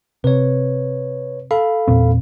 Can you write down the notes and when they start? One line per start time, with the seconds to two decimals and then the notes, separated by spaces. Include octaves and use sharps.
0.24 C3 B4 C#5
1.51 A4 F5 B5
1.88 E2 A#2 C4